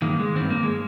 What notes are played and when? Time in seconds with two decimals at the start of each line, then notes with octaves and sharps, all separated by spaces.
0.02 G2 D#3 A#3
0.20 G#3
0.35 G2 D#3 C4
0.50 A#3
0.63 G#3